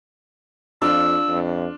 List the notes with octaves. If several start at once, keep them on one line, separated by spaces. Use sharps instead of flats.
F2 D4 F4 E6
F2